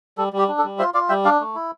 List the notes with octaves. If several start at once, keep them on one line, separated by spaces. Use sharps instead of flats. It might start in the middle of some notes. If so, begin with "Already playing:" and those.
G3 A4
G3 G4
D4
A4
G3
F4 C5 E5
F4 D5 F5
G3 E5 G5
D4 D5 F5
A3
E4